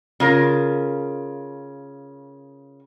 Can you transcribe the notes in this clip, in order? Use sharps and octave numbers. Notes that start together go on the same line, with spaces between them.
C#3 F4 A#4